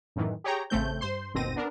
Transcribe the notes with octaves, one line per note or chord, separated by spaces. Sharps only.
F#2 A2 D#3 E3
G4 G#4 C#5 G5 A#5
A1 C#3 A3 C4 G6
G2 C5 C6
G1 D#2 B2 C4 A#6 D#7
B3 D4 A#4